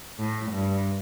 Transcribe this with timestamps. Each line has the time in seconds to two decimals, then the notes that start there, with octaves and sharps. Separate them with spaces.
0.19 A2
0.52 G2